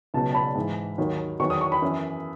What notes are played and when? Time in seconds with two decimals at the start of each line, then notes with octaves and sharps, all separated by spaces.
0.14 C#2 B2 F#3 A5
0.31 A5
0.35 B5
0.55 G#2 E3
0.98 D#2 D#3 F#3
1.40 E2 D#3 F#3 C#6
1.50 D#6
1.61 C#6
1.72 B5
1.82 F#2 E3